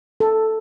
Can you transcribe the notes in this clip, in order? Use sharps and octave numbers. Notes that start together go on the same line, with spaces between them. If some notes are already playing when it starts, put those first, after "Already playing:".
A4